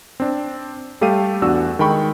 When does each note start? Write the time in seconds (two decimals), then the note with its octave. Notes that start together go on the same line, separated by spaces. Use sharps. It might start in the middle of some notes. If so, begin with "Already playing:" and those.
0.20 C4 D4
1.01 G3 A3 G4 A4 F5 D#7
1.42 E2 D4 F#4 E6
1.79 D#3 G#3 G5 B5 C#6